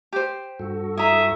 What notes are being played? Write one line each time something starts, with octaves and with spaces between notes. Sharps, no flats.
G4 C5
G2 F#4 A4
E4 E5 A#5 D#6